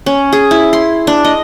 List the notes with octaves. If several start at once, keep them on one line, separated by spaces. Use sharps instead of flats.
C#4
G#4
E4
C6
D4
D#5